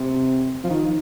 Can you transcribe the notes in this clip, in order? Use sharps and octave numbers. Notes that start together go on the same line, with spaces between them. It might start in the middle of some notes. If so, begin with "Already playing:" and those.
Already playing: C3
F3
D#3